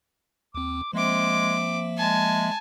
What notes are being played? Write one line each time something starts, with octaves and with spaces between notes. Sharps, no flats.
D#2 C4 D6
F3 G#3 A#3 C4 E5 D6
G#3 G#5 A5